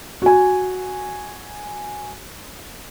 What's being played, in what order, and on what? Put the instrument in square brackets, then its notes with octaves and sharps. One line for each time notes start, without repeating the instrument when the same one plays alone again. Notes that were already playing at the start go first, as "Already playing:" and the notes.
[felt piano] F#4 G#5